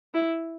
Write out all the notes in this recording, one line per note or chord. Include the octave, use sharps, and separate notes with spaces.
E4